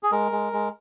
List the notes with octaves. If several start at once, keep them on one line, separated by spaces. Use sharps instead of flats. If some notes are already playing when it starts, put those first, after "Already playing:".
G#4
G#3 A#4
G#3
G#3